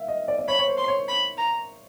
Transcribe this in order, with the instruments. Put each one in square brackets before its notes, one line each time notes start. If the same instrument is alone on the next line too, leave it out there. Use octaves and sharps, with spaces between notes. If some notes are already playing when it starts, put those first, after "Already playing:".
Already playing: [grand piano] E5 F5
D#5
D5
D5
[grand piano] C#5 [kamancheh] B5
[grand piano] C#5
C5
[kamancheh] C6
[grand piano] C#5
[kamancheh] B5
A#5